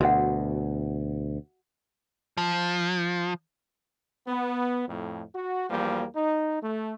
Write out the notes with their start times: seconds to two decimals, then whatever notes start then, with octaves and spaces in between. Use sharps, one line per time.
0.01 D2 B2 F#4 E5 F#5
2.37 F3
4.27 B3
4.88 F2 A2
5.35 F#4
5.69 E2 F3 G3 A#3
6.16 D#4
6.63 A3